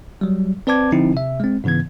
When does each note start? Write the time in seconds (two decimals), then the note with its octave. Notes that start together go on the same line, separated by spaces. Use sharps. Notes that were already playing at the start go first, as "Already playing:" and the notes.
0.21 F#3 G3
0.67 C4 B4 D5 A5 D6 G#6
0.92 D3 F3 C4 D#4 E4
1.14 C3 E5
1.40 G#3 C4
1.64 G#2 C#3 E3 B3 G#6